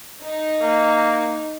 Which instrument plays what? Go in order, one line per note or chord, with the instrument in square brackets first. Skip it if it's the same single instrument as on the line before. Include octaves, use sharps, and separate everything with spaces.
[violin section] D#4
[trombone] A#3